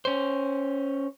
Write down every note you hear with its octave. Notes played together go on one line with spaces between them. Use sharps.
C#4 C5